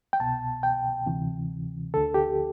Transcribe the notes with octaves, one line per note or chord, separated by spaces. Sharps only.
G5
C2 B2 A5
G5
D2 C3 E3
D2 D3 A4
G4